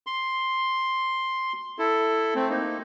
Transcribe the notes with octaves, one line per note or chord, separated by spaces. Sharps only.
C6
E4 A4
A3 C4
A#3 D#4